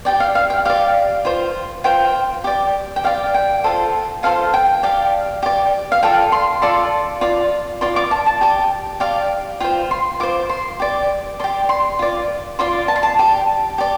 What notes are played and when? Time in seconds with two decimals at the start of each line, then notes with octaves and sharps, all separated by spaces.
0.05 G4 D5 G5
0.20 F5
0.35 F5
0.50 G5
0.65 G4 D5 F5
1.25 F4 C5
1.84 F4 C5 G5
2.44 G4 D5
2.96 G5
3.04 G4 D5 F5
3.34 G5
3.64 F4 A4 C5
4.23 F4 A4 C5 F5
4.54 G5
4.83 G4 D5 F5
5.42 G4 D5
5.92 F5
6.03 F4 A4 D5 G5
6.32 C6
6.62 F4 A4 D5 C6
7.21 F4 D5
7.81 F4 D5 C6
7.96 D6
8.11 A5
8.26 A5
8.41 G4 D5
9.00 G4 D5 F5
9.60 F4 C5 G5
9.91 C6
10.20 F4 C5 D6
10.49 C6
10.80 G4 D5
11.40 G4 D5 C6
11.69 C6
11.99 F4 D5
12.59 F4 D5 C6
12.88 A5
12.96 C6
13.03 A5
13.19 G4 D5
13.78 G4 D5